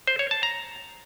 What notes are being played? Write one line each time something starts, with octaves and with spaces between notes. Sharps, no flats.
C5
C#5
A5
A#5